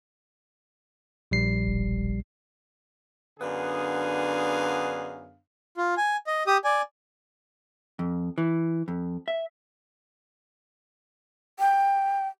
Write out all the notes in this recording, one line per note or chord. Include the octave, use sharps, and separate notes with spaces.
A#1 G3 C7
E1
F#2 D3 B3 D4 G#4 F5
F4
G#5
D#5
G4 D#6
D5 G#5
F2
E3
F2
E5
G5